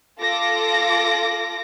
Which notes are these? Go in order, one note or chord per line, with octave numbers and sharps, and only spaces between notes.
F4 A4 D6 A#6